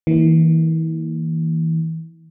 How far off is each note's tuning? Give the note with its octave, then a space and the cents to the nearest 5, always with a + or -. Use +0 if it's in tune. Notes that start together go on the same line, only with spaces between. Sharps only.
E3 -35 A#3 -10